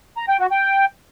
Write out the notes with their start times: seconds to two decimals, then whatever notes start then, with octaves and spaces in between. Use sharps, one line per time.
0.17 A#5
0.28 G5
0.40 F#4
0.51 G5